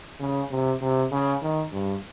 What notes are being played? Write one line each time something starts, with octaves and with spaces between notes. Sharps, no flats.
C#3
C3
C3
C#3
D#3
G2